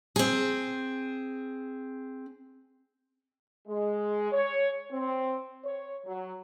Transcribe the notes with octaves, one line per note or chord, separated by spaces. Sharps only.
C4 G#4
G#3
C#5
C4
C#5
F#3